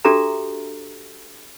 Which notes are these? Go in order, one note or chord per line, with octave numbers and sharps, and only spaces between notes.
D4 F#4 G4 A4 E5 A#5